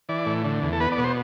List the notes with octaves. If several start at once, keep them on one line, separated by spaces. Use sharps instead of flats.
E3 D5
A2
D3
E2
A4
B3 B4
D5
B2
C5